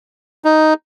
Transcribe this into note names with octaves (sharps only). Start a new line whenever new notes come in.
D#4